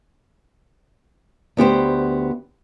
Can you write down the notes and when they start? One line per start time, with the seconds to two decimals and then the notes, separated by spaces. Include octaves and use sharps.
1.57 D2 B3 G4 C5